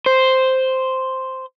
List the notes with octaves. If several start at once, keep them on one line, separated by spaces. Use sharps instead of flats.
C5